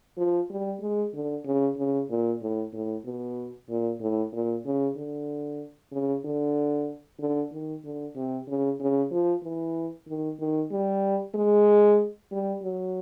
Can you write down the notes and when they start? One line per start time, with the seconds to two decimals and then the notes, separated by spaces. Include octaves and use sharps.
0.18 F3
0.50 G3
0.81 G#3
1.13 D3
1.45 C#3
1.78 C#3
2.10 A#2
2.41 A2
2.73 A2
3.05 B2
3.69 A#2
4.00 A2
4.33 A#2
4.65 C#3
4.97 D3
5.92 C#3
6.25 D3
7.19 D3
7.52 D#3
7.84 D3
8.16 C3
8.47 C#3
8.80 C#3
9.11 F3
9.43 E3
10.07 D#3
10.39 D#3
10.71 G3
11.35 G#3
12.31 G3
12.62 F#3